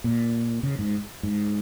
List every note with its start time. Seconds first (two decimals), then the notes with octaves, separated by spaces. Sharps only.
0.04 A#2
0.63 C#3
0.79 G#2
1.23 G#2